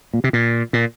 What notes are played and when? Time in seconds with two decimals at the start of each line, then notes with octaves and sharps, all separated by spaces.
0.14 A#2
0.24 C3
0.33 A#2
0.73 A#2